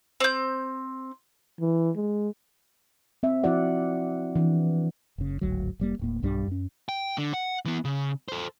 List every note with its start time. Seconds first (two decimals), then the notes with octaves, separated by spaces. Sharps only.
0.20 C4 G6
1.61 E3
1.96 G#3
3.23 C4 E5
3.43 F3 E4 F#4 D5 F#5
4.36 E3 D4
5.18 F#1 C#3
5.41 D1 G#1 D2 F#3
5.80 F1 G3 A#3
5.99 D1 A2 A#3
6.22 B1 G2 G3 D4
6.48 F#2 C#4
6.89 G5
7.18 D3
7.34 F#5
7.65 E3 B3
7.85 C#3
8.28 A4 C5